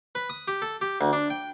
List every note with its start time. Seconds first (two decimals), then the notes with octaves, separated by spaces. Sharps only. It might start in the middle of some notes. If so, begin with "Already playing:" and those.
0.15 B4
0.30 D#6
0.48 G4
0.62 A4
0.81 G4
1.01 D2
1.13 D4
1.30 G5